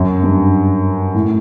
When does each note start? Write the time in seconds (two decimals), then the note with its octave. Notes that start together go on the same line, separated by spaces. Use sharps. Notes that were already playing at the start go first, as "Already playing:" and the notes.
Already playing: F#2
0.23 G2
1.14 A2